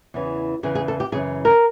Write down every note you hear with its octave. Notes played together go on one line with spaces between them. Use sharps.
E2 C#3 E3
E2 C#3 E3 G#4
G#4
A4
G4
F#2 C#3 E3 G#4
A#4